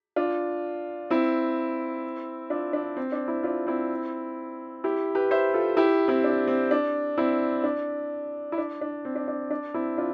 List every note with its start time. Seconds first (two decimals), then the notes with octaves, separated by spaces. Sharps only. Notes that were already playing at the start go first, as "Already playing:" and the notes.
0.16 D4 F4
1.10 C4 E4
2.50 D4 F4
2.73 D4
2.97 C4
3.12 D4
3.28 C4 E4
3.43 D4 F4
3.67 C4 E4
4.84 E4 G4
5.15 G4 B4
5.31 C5 E5
5.54 F4 A4
5.77 E4 G4
6.08 C4 E4
6.24 D4
6.48 C4
6.71 D4
7.18 C4 E4
7.64 D4
8.52 E4
8.58 D4
8.81 D4
9.05 C4
9.16 D4
9.28 D4
9.51 D4
9.74 C4 E4
9.98 D4 F4